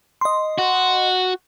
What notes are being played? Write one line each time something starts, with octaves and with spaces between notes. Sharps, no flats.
D#5 C6
F#4